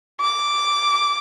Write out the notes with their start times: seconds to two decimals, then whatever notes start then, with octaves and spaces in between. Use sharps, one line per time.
0.21 D6